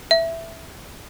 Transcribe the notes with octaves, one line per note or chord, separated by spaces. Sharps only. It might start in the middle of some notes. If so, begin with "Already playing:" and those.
E5